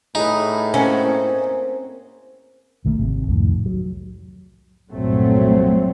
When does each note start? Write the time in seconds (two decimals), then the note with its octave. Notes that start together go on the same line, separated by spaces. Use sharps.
0.15 A2 D#4 G#4 B4
0.74 A#3 C4 C#4 F#5
2.85 B1 D#3 A3 A#3
2.99 G#1 C3
3.28 C2 F2 A2 D#3
3.66 F#3
4.90 C2 G2 A#2 F#3 A3 C4